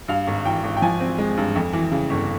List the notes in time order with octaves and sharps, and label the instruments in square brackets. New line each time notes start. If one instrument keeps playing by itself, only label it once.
[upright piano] G2 F5
G#1
E3 G5
G#1
G5
F3 G#5
C4
G#3
G2
F2
E3
C#3
G1